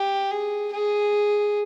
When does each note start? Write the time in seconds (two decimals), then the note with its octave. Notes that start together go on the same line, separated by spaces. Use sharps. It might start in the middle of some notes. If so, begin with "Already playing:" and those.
Already playing: G4
0.31 G#4
0.72 G#4